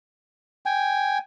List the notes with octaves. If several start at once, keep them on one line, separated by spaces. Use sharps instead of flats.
G5 G#5